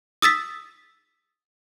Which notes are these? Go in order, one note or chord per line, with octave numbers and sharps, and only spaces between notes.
D#6 E6 A6 B6